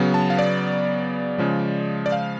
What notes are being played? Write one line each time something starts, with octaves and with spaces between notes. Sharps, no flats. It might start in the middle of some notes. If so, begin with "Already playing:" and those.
Already playing: C#3 F#3 B3
A5
F5
D5
C#3 F3 G#3
D5
F5